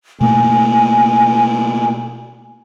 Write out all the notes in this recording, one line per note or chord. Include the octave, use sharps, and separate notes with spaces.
B2 A3 A#3 G#5